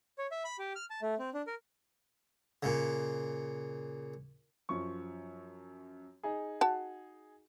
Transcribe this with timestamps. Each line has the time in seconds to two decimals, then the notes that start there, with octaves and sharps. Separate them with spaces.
0.18 C#5
0.31 E5
0.45 B5
0.59 G4
0.76 F6
0.90 A5
1.02 A3
1.19 C4
1.34 D4
1.47 A#4
2.63 A#2 C#3
4.69 F#2 F3 C#6
6.23 D#4 G#4
6.61 F#4 A5